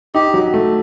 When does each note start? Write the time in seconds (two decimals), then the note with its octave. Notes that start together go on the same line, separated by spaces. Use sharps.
0.14 D#4 G4
0.34 F#3
0.54 A3